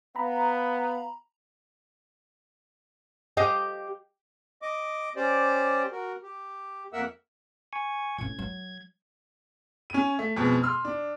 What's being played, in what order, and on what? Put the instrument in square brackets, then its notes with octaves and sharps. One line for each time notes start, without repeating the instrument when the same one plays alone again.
[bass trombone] B3 [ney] F5 [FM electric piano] A#5 B5
[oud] G4 D#5 F5
[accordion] D#5 D6
C#4 G4 C5 D5
F#4 A#4
G4
F2 A#3 A#4 E5 F#5 E6
[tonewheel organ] G#5 C#6
[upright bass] A2 C#4 [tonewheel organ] G#6
[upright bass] F#3
[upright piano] C#4 D#7
A3
F2 B2 G#3
C6 E6 F6
D4